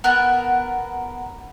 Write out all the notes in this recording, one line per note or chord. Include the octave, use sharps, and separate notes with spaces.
B3 A#4 A5 F#6